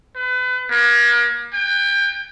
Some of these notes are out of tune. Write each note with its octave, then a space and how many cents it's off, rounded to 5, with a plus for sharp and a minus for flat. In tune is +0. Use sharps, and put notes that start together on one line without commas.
B4 +35
A#3 +40
G5 +30